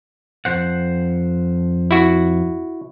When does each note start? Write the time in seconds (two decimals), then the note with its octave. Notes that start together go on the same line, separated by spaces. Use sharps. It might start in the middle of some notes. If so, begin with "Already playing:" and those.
0.45 F2 C5 F#5
1.91 E4 F#4